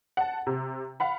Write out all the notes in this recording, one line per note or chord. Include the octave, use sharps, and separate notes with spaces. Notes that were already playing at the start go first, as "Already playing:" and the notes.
F#5 A5
C3
F5 F#5 B5